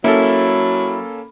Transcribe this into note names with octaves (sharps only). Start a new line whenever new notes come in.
F#3 A#3 C#4 E4 A4